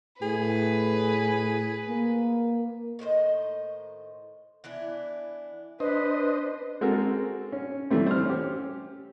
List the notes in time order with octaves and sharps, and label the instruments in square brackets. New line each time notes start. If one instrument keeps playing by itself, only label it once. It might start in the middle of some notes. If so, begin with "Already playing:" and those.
[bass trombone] A2 [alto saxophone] G#4 [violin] B4
[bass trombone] A#3
[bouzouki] A2 D#3 C5 D#5
E3 B3 D4 E4
[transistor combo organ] D4 C5 D#5 [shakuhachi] B4
[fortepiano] G#3 C4 F#4 A4 A#4
C#4
E3 G3 A3 C4
C5 F6
C#4 G4